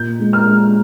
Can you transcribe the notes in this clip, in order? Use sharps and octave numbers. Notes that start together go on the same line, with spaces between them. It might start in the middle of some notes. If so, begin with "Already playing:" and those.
Already playing: A#2 G6
G#3
F6
G#3